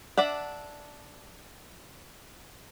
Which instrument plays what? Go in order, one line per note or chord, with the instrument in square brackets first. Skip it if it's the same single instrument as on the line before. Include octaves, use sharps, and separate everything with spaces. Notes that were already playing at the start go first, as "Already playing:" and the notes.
[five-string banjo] D4 D5 E5 F#5